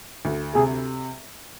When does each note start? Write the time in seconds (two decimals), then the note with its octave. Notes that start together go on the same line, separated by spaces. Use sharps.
0.25 D2
0.55 C3 G#4